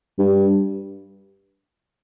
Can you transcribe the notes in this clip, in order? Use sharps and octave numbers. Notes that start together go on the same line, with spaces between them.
G2